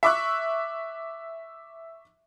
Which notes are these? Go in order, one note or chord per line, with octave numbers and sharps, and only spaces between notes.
E5 C#6 D6 E6 F#6